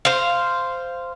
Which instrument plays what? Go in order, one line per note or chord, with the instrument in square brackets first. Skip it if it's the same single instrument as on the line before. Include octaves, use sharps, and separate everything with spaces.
[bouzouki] C5 F5